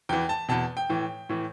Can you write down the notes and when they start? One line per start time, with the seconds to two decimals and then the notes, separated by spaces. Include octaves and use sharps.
0.09 E2 E3 G5
0.29 A5
0.49 E2 B2 A5
0.77 G5
0.89 A2 E3
1.29 A2 E3